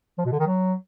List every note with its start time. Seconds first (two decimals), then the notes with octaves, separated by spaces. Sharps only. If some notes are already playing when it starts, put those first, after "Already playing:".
0.18 F3
0.25 B2
0.32 D3
0.39 D#3
0.46 F#3